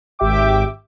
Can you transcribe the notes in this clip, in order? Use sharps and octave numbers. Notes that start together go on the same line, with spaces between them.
G#1 G4 E5 G5 D6